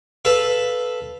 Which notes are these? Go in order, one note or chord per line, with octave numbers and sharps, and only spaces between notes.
A4 B4 F5